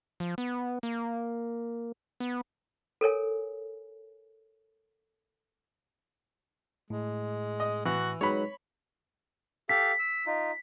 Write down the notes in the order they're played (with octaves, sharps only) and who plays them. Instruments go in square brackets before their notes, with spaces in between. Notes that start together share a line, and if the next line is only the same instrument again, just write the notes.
[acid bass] F3
B3
A#3
B3
[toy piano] A4 A#4 C#5 G#5
[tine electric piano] A2 [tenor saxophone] G#3
[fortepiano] D#5
[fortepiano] E3 [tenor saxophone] F#4
[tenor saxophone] F#3 [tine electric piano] G#3 D#4 B4 [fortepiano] C#5 B5
[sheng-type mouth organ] G4 A4 F5 [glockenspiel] B6
[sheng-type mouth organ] E6
D#4 F4